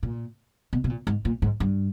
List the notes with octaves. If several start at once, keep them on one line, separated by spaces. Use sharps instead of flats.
A#2
B2
B2
A#2
G#2
A#2
G#2
G2